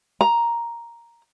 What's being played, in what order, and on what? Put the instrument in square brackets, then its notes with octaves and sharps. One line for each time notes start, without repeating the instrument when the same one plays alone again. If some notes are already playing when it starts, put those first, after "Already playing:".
[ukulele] A#5